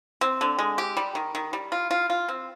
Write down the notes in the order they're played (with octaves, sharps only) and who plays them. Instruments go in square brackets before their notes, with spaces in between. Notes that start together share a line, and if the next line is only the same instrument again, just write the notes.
[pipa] C4
D3
G#3
G4
G3
D#3
D#3
G3
F4
F4
F4
C4